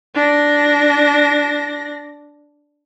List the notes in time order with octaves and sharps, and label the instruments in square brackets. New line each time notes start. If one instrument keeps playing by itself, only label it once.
[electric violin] D4 A#6